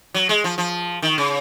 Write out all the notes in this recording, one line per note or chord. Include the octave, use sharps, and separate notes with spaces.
F#3
G#3
F3
F3
D#3
C#3